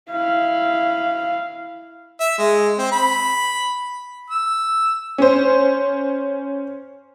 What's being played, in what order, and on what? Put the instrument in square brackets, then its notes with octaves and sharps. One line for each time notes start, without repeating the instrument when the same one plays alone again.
[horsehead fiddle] E4 F5
[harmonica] E5
G#3
C4
B5
E6
[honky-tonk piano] C#4 C5